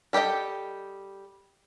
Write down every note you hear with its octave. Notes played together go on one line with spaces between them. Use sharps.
G3 G4 A4 D#5 G5